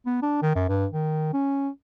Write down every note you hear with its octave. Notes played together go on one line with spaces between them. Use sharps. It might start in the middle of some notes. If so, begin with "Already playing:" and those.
B3
D4
D#3
F#2
G2
D#3
C#4